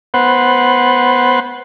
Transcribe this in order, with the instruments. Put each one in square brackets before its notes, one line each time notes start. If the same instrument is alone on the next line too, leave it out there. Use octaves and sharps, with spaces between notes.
[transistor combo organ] B3 C5 F#5